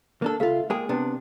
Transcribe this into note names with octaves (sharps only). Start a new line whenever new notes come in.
A#3 D4 A4
C#2 F4 A4 E5 F5
G#3 A#3 G#4 G5
C3 B3 D4 A5